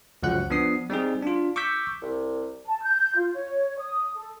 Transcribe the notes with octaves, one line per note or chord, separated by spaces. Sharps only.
C#2 F#2 F3 F#4 F#5 F#6
F3 B3 D4 D#6 C7
G3 C4 D#4 G#4
D4 F4
C#6 D6 E6 G6 B6
C2
A5
G6
F4
C#5
D#6
A4